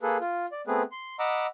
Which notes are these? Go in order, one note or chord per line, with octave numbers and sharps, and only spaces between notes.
A#3 G#4 A4 B4
F4
D5
A3 B3 C4 G#4 B4
C6
D#5 F#5 A#5 B5 D6 E6